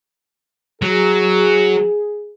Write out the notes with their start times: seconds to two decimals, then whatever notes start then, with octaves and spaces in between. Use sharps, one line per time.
0.82 F#3 G#4